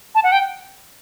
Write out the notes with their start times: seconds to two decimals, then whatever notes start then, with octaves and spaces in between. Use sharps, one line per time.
0.15 A5
0.24 F#5
0.32 G5